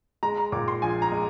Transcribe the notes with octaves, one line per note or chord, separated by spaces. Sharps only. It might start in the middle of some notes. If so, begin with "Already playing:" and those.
G#3 A#5
A#5
A#2 D6
C6
A#1 G#5
A#5
G#3